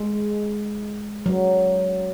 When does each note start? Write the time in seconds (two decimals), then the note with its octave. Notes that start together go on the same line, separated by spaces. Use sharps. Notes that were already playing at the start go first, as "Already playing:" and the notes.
Already playing: G#3
1.26 F#3